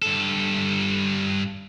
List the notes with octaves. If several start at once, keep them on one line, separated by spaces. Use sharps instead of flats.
G2 A4